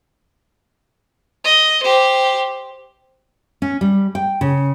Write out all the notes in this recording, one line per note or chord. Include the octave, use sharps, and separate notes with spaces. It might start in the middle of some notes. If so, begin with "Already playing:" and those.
D#5
G4 C5
C#4
G3
G5
C#3